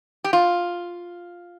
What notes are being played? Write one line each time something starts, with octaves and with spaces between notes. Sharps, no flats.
G4
F4